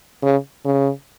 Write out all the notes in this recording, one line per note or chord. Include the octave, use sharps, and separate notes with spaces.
C#3
C#3